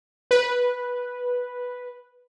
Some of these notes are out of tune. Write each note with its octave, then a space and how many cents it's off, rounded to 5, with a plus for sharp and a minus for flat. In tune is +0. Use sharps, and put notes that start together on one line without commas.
B4 -5